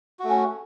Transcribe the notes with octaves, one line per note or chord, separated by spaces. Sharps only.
A3 C#4 F#4